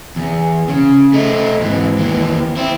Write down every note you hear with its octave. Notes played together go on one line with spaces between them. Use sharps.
E2
C#3
A3 D#4
G#2 E3
D#2 E3
C4 E4